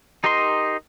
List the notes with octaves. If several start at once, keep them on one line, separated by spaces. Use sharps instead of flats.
D#4 G4 A#4 D#5 C6